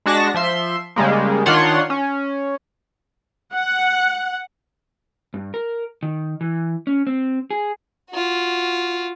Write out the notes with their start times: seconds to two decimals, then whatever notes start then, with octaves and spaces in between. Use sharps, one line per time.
0.06 G#3 D4 F#4 A5 A#6
0.34 F3 E5 C6
0.96 C#3 G3 G#3 A#3
1.46 D#3 D4 F4 C#5 F#5 C6
1.90 C#4
3.53 F#5
5.34 G2
5.54 A#4
6.03 D#3
6.41 E3
6.87 C#4
7.07 C4
7.50 G#4
8.11 F4 F#4